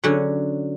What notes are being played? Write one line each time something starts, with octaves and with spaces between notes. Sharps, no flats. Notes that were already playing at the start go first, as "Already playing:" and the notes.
D3 F#3 C#4